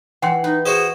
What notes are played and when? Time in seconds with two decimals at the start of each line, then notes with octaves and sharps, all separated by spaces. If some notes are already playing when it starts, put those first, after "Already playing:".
0.22 E3 F#5 G5 C6
0.44 D#4 B4
0.66 F#4 G#4 C5 D#5